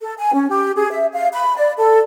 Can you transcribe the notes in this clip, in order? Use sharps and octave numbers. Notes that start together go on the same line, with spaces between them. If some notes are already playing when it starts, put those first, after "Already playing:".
A4
G#5
C#4
G4
G#4
E5
F5
B5
D5
A4